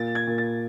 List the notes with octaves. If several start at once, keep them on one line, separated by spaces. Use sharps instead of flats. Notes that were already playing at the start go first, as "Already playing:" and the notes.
Already playing: A#2 A6
G#6
A#2
A6